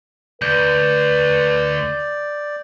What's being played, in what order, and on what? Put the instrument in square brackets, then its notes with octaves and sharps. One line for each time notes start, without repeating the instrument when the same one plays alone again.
[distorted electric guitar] D2 [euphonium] B4 [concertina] D5 [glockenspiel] G6